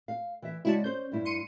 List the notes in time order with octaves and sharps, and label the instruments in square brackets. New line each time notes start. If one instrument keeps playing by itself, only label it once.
[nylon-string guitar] F5
E3 E5
[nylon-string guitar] C#3 G#3 D5 [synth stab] E4 F#4 A5
[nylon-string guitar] C#4 C5 [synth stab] G6
[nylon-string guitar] G2 E4
[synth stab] C6 C#7 D#7